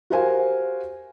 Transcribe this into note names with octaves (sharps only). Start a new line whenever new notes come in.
F#4 G4 A#4 C5 F5 G#5